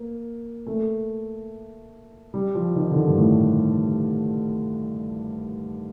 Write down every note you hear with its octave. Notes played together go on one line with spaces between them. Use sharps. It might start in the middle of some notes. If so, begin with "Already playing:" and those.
Already playing: A#3
A3
G3
F3
D#3
D3
D#3
G2
A2